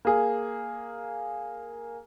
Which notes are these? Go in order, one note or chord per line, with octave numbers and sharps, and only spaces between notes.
A#3 G#4